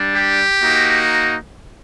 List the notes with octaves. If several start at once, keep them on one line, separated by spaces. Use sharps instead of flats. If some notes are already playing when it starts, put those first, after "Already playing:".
Already playing: G3 D4
G4
A#3 D#4 F#4